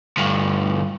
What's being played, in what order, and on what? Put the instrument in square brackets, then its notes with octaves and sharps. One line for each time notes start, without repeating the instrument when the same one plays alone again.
[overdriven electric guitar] D2 G2